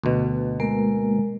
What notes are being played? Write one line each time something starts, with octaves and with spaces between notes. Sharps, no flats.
D2 B2
G#3 A#3 A#4